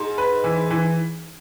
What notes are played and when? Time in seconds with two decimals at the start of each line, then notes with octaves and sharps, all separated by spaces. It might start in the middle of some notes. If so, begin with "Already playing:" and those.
Already playing: G#2
0.18 B4
0.44 E3
0.70 E3